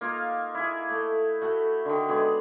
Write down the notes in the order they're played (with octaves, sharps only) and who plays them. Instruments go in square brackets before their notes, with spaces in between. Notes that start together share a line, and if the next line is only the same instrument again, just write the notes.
[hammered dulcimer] A#3 D#4 F4 F5
E4 G#4
A3
A3 F#4
D3 D#3
B2 G#3 G#4 D6